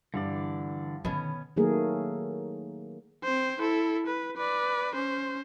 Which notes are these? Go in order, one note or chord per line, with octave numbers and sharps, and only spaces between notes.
G2 D3 E3 D5
B2 D3 D#3 B3 C#4
D#3 F#3 A3 A#3 G#4 A#4
C4 C5
E4 A4
B4
B4 D5
C#4 C5